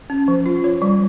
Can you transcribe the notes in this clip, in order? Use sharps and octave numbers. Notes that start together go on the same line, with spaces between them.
C#4
F3
F4
C#5
G3